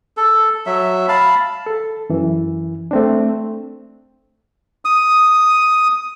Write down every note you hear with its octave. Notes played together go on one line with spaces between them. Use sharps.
A4
F#3 E5
F5 A5 B5
A4
F#2 E3
A3 C4 D4
D#6